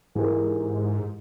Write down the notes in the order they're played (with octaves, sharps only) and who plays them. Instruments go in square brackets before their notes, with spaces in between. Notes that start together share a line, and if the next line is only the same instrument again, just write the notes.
[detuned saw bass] G#2 [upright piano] E3 G#3 E4 G4 A#4